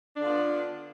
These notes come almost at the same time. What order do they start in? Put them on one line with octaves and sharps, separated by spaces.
D4 D3 F4 B3